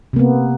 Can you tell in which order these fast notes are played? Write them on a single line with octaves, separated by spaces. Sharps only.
C3 A#3 B3